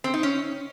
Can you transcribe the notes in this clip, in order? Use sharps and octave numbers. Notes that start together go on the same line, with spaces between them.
C4
D#4
C#4